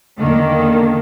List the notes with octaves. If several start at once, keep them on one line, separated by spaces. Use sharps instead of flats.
E2 D3 D#3 A#3